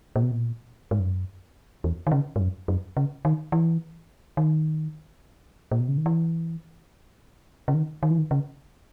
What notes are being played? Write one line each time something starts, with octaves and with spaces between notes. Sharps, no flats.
A#2
B2
A#2
G#2
F#2
E2
D#3
C#3
G#2
F#2
F#2
C#3
D#3
E3
D#3
A#2
B2
C#3
D#3
E3
C#3
D#3
D#3
E3
D#3
C#3